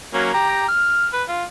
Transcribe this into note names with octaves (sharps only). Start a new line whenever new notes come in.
F#3 A#3 C#4
G4 A#5
F6
B4
F4